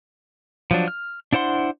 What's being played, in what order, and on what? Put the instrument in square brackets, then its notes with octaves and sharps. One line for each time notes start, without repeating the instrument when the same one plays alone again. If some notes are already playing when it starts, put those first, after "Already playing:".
[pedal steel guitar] F3 F#3 D4
F6
D4 E4 C5 F#5 C6